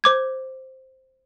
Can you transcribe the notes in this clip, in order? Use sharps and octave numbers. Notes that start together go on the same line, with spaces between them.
C5 D6 G#6